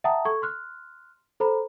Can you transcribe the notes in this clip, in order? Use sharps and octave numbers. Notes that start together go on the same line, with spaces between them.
E5 F#5 G5 A5 A#5 D#6
A4 C#6 G#6
C6 F6 F#6
A4 C5 A#5 B5